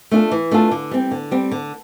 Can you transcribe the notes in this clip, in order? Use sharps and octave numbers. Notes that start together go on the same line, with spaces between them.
A3 D4 F4 A4
E3
A3 D4 F4 A4
D3
G3 C4
D3
G3 C4
D3